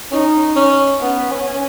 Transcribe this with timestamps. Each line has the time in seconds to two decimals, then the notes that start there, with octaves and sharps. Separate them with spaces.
0.12 C#4 D#4
0.56 C#4
1.01 B3
1.31 C#4